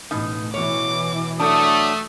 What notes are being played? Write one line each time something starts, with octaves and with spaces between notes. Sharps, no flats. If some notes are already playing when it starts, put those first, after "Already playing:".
A1 B2 D#4
B2 E3 C#5 D6
F#3 A3 D4 D#6